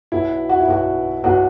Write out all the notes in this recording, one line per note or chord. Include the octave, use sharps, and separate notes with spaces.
B1 B2 E4
F#4
E4
B1 B2 F#4
B1 B2 F#4